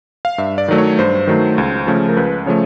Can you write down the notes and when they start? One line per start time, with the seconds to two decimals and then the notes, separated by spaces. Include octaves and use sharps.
0.25 F5
0.38 G2 E5
0.58 D5
0.68 D#3 F#3 A3
0.78 C#5
0.99 G2 C5
1.27 D#3 F#3 A3
1.58 C#2
1.87 C#3 F3 A3 C#4
2.09 A#4
2.17 C#2 B4
2.46 C#3 F3 A3 C#5